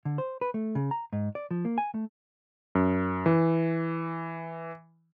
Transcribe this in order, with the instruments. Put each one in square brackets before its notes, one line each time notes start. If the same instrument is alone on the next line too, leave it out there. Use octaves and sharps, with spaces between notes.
[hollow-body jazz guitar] D3
C5
B4
A3
C#3
A#5
G#2
D5
F3
A#3
G#5
A3
[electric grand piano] F#2
E3